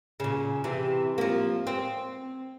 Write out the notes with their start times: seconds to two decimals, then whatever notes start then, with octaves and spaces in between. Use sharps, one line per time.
0.20 A#2 C#3
0.64 C3 E3
1.18 F3 A#3
1.67 C4